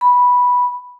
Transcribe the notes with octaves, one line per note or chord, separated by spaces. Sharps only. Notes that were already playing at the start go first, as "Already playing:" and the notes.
B5